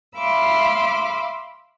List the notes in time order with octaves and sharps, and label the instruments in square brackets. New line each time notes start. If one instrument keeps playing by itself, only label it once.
[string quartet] E5 F5 B5 C6 D6 E6